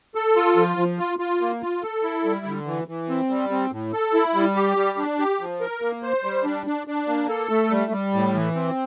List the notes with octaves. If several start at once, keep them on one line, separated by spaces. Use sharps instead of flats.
A4
F4
F3
F3
F4
F4
A#3
F4
A4
E4
G3
D3
E3
E3
C4
G3
C4
A2
A4
E4
G3
G4
G3
D4
G4
F3
A#4
A#3
C5
G3
D4
D4
D4
A#3
A4
A3
G3
G3
A2
E3
C4